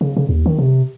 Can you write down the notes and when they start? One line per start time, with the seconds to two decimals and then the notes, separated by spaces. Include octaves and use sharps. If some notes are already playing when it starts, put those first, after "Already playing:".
0.01 C#3
0.17 C#3
0.29 D#2
0.46 D#3
0.59 C3